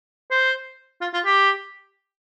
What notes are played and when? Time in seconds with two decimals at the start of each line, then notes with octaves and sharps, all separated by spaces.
0.31 C5
1.01 F4
1.14 F4
1.25 G4